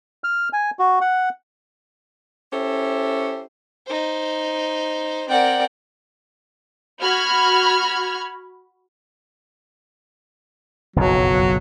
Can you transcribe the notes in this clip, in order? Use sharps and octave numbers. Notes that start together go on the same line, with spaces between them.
F6
G#5
F#4
F#5
C#4 E4 G4 A4 C5
D#4 C5
C4 A#4 D5 F#5 G5
F#4 B5 F6 G#6
F#1 B1 F2 F#3